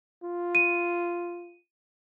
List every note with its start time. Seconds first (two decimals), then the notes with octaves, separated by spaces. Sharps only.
0.23 F4
0.55 D#7